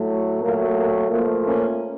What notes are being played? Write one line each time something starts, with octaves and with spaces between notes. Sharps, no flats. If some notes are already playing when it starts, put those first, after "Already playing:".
Already playing: A2 F#3 A3
A#2 F#3 A3 A#3
A#3
A#2 F3 A3 A#3
A#3 C#4